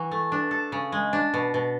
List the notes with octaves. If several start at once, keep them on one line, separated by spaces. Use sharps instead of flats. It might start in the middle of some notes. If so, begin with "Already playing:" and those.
Already playing: E3 F#4
A3
D4
A4
C#3
G#3
D4
B2
B2